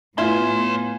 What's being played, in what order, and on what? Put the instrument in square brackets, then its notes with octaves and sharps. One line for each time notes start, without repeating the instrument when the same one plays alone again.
[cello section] A2 B3 [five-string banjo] E4 [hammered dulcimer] F4 G#5 [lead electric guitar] C#5 C6